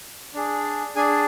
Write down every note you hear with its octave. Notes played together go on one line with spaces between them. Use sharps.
D4 G#4
D4 G#4 G#5